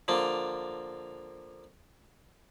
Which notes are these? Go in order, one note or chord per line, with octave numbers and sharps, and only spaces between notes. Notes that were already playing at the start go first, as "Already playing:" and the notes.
D3 F3 A#3